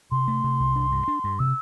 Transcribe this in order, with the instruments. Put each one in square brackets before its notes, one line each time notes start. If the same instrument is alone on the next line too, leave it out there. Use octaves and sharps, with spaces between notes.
[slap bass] C3 [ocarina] C6
[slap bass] A3
C3
C2
D4
G2
D4
G2
[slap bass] C3 [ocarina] E6